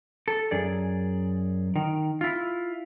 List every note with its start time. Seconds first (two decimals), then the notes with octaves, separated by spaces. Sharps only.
0.28 A4
0.51 F#2 G#4 D5
1.76 D#3
2.21 E4 F4